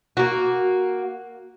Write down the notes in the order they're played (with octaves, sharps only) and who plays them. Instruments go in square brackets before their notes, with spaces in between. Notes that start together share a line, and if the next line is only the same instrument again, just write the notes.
[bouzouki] A#3 F#4